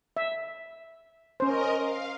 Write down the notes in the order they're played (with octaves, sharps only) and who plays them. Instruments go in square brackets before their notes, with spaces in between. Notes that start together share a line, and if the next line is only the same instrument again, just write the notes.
[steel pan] E5
[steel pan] C#4 C5 [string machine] A#4 D#5
[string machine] F5